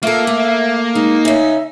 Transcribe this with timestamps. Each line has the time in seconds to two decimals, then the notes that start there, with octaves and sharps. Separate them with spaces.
0.03 A#3 F4 A4 E5
0.27 A3
0.95 G#3 D#4
1.25 C#3 C#4 E5